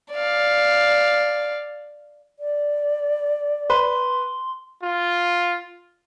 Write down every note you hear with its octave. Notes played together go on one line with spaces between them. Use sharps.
D5 F5
D5
B4 C6
F4